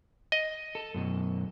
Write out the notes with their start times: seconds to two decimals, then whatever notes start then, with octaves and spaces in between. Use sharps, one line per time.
0.32 D#5
0.75 A4
0.94 F#2 B2